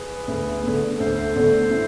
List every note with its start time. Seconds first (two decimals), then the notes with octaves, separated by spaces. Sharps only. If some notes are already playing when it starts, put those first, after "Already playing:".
Already playing: G#4 B4
0.28 D2
0.63 D3 A3
0.99 D2 A4 C5
1.36 D3 A3
1.71 E3